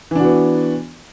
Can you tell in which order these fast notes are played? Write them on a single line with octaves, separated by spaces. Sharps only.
E3 D4 F#4 B3